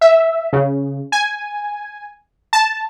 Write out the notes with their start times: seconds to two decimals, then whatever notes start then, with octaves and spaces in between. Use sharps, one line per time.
0.01 E5
0.53 C#3
1.12 G#5
2.53 A5